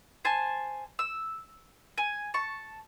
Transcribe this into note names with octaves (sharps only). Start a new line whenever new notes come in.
C5 G#5 A5
E6
G#5
A5 C#6